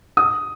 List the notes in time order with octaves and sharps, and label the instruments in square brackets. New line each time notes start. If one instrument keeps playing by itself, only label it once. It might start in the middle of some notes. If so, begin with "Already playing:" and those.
[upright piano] D#6